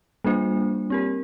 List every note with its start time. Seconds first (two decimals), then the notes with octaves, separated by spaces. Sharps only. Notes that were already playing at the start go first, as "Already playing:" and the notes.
0.24 G3 A#3 D4 F4 C5
0.90 C4 G4 A#4